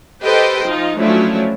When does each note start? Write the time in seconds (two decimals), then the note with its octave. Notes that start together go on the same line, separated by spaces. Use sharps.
0.23 G4 A4 B4 C5 D#5 G5
0.63 F3 D#4 F4
0.98 F3 F#3 A3 C#4 D4 E4